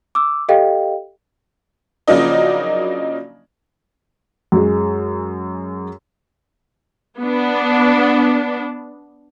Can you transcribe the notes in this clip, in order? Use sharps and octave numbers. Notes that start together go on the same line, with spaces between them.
D6 E6
G4 A4 D#5 F5 G5
C#3 F3 F#3 A#3 D4 D#4
F#2 G#3
B3 D4